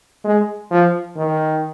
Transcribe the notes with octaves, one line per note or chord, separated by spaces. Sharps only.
G#3
F3
D#3